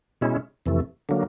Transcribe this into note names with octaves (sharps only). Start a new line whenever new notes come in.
B2 G#3 C#4 E4
F2 C3 E3 A3
D3 F#3 A#3